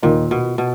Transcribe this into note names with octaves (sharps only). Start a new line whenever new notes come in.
D#2 A#2 D#3 A#3 D#4
B2
B2